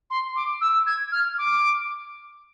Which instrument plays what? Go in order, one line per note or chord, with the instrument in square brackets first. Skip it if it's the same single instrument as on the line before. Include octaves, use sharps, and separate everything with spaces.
[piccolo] C6
D6
E6
G#6
F6
D6